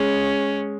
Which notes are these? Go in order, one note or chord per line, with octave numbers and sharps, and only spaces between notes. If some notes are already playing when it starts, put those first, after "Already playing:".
Already playing: G#3 C#4